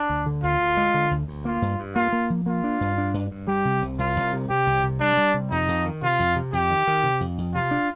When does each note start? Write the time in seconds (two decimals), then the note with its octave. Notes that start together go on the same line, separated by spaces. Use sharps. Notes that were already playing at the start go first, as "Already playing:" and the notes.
Already playing: D4
0.09 D2
0.26 D3
0.43 D2 F4
0.60 D2
0.77 G#3
0.94 D3
1.11 D2
1.28 D2
1.45 A#3 F4
1.62 G2
1.79 G2
1.95 A#3 F4
2.13 A#3
2.30 F3
2.46 A#3 F4
2.64 D4
2.81 G2
2.98 D4
3.14 G2
3.31 G2
3.47 G3 G4
3.65 C3
3.82 C2
3.99 C2 F4
4.16 C2
4.33 C3
4.49 C3 G4
4.67 C2
4.84 C3
5.00 G3 D4
5.17 G3
5.34 C3
5.51 F2 D#4
5.68 F2
5.85 D#3
6.02 C3 F4
6.19 F2
6.36 C3
6.53 F2 G4
6.70 D#3
6.87 D#3
7.04 C3
7.20 F2
7.38 F2
7.55 C3 F4
7.71 D4